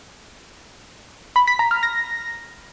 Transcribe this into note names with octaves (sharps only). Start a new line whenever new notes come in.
B5
B6
A#5
F6
A#6